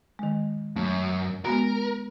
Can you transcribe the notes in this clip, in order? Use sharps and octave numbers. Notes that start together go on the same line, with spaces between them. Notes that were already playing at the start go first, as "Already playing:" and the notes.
D#3 G#3
F#2 A3
G#3 B3 F#4 A#4